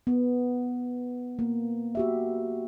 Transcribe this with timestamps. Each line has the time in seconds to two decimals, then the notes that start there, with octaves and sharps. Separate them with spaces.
0.07 B3
1.39 A#3
1.95 F#4 G4 E5